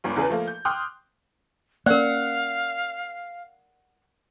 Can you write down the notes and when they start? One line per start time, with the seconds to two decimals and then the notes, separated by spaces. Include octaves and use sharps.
0.04 G1 C#2 G2
0.16 E2 C#3 G#4 B4
0.29 F3 A3 A#3
0.47 G6
0.65 G5 C6 D6 D#6 F6 F#6
1.86 A#3 C#4 A#4 D5 F5 F#5